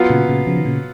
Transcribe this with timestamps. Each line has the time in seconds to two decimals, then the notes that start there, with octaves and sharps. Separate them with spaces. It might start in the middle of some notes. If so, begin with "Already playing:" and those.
Already playing: F#3 B3 F4
0.10 A#2 C#3
0.29 A#2 C#3
0.47 C#3 F3
0.57 D#3
0.65 A#2 C#3